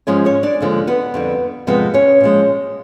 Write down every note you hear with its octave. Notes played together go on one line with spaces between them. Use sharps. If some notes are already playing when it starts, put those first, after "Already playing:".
G#2 F3 G#3 C#4 C#5
C#4 C#5
D4 D5
D#2 D3 F3 G#3
B3 B4
F2 D3 G3
F2 C3 F3 G#3 B3 B4
C#4 C#5
A#2 F3 G#3